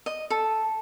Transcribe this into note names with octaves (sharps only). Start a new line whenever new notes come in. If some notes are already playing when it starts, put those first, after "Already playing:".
D#5
A4